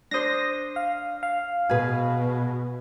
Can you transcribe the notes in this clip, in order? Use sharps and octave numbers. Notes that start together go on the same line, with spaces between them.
D4 C5 D#6 A#6
F5
F5
B2 G#4 B4